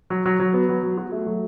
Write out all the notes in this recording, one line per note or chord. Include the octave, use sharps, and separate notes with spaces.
F#3
F#3
F#3
B3
F#3
F#3
F#4
A3
F#3